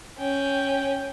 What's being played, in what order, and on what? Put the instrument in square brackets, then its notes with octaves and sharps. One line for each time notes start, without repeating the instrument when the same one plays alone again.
[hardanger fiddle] C#4 G5